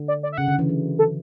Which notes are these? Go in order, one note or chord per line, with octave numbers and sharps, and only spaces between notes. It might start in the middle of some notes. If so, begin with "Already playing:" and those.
Already playing: D3
D5
D5
E5
C#3 F#5
D3
E3
F#3
A4